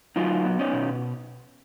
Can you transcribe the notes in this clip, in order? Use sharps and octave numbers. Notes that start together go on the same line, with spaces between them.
F#3 D#4 F4
B3
C#4 D#4
B2